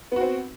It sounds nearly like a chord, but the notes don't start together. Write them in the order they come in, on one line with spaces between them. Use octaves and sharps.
B3 F#4 C4